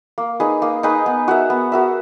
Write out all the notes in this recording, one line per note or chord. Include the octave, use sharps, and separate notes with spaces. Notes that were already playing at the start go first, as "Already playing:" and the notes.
A#3
D#4 G#4 B4
A#3
D#4 G#4 B4
B3
F#4 A#4 E5
B3
F#4 A#4 E5